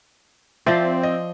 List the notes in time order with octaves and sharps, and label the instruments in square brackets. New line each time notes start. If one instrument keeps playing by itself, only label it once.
[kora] F3 D5 [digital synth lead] C4 [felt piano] E5
[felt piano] D#5